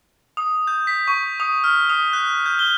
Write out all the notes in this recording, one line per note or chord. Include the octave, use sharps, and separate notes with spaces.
D#6
G6
B6
C#6
D#6
F6
D#6
F#6
G6
G7